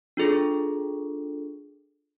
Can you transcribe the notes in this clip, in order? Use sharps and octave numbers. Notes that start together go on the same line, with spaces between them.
D4 F4 G#4 A4